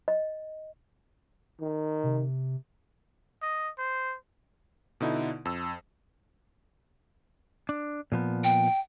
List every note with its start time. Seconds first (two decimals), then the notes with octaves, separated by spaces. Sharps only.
0.08 D#5
1.61 D#3
2.04 C3
3.42 D#5
3.78 C5
5.00 B2 D3 D#4 E4
5.45 F2 E6
7.69 D4
8.12 A#2 F3 B3
8.44 G5